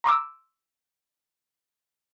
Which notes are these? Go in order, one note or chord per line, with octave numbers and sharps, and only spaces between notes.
A#5 C6 D6 E6